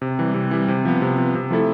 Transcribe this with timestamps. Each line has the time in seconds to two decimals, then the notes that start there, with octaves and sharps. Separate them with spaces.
0.02 C3
0.19 E3 G3
0.34 C3
0.51 E3 G3
0.68 C3
0.85 F3 B3
1.02 C3
1.18 F3 B3
1.35 C3
1.51 F3 A3 E4 A4